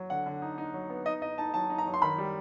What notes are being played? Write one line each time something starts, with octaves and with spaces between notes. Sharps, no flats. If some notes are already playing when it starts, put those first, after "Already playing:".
Already playing: F#3
D3 F#5
D3
D#4
D#4
F#3
B3
D#4 D#5
D#4 D#5
D#4 A5
F#3 A5
D#4
A#5
F#3
C6
D#3 B5
G3